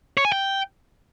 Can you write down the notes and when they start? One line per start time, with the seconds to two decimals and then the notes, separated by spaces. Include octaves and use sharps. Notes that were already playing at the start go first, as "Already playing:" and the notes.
0.17 C#5
0.25 G#5
0.32 G5